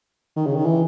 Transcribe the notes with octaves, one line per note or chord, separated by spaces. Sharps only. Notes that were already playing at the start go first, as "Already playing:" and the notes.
D#3
C#3
D#3
E3